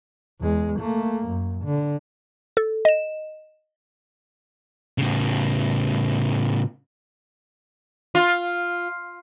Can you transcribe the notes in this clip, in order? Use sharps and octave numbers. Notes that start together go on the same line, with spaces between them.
E2 G#3
A3 A#3
F#2
D3
A4
D#5 E7
A2 C#3
F4